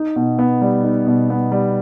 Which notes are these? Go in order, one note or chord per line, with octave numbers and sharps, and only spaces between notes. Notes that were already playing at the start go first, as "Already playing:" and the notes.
Already playing: D#4
B2
B3
G3
D#4
B2
B3
G3